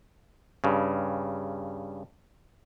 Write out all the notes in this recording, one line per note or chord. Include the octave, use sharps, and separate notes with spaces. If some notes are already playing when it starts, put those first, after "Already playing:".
G2 C#3